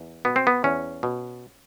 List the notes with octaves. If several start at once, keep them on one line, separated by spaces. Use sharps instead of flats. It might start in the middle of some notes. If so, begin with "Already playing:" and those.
Already playing: E2
B2 B3
C4
B3
E2 C#4
B2